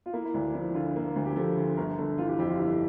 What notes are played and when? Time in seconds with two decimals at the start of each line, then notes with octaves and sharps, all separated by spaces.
0.06 F4
0.13 A#3 E4
0.25 E4
0.34 D2 D4
0.54 F3 E4
0.74 D3 F4
0.96 A#3
1.16 D2
1.25 G4
1.36 F3 A4
1.57 D3
1.77 G1 A#4
1.98 G1 A4
2.18 E3 F4
2.28 G4
2.39 F2 G4
2.49 F4
2.59 G1 E4